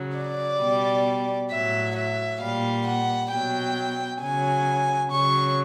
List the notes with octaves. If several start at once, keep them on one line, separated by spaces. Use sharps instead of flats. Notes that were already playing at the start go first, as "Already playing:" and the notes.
Already playing: C#3 F#3
D5
B2 G3
A2 F#3 E5
E5
A#2 G3 F5
F#5
B2 F#3 G5
C#3 F#3 G#5
C#3 F#3 C#6